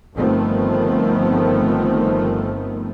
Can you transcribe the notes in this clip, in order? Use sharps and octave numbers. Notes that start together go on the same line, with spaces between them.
G1 D#3 F3 A3 B3 C4